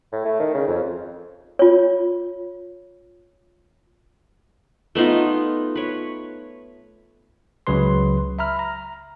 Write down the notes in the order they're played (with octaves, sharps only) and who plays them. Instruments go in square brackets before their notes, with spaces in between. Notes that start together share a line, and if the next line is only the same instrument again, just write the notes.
[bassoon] A2
A3
D#3
C#3
F2
[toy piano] F4 C#5
[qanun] A3 B3 D#4 F4
B4 C#5
[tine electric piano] C#2 C#3 F#3 B4 C6
E5 A#5 B5 F6
A#5